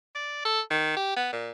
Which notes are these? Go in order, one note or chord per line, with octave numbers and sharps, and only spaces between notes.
D5
A4
D#3
G4
B3
A#2